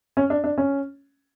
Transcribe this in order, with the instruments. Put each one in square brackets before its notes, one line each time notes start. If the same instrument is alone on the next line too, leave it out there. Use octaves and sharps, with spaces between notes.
[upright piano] C#4
D4
D4
C#4